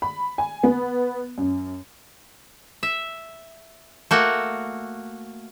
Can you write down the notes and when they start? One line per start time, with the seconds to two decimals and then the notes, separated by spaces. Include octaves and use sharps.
0.02 B5
0.38 G#5
0.63 B3
1.38 F#2
2.83 E5
4.11 A3 A#3 F#4